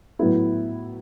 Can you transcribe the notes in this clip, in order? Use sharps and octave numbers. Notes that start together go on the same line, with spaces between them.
A2 F#3 B3 E4